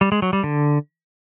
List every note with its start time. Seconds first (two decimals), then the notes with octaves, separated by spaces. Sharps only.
0.01 G3
0.12 G#3
0.22 F#3
0.33 G3
0.44 D3